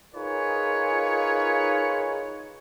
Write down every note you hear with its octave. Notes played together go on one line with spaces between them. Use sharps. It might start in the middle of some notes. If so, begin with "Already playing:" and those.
D#4 F4 G#4 A#4 B4 C#5